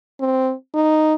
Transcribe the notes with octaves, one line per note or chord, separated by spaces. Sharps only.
C4
D#4